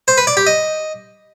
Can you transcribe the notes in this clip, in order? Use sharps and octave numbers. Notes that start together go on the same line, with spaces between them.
C5
B4
D5
G4
D#5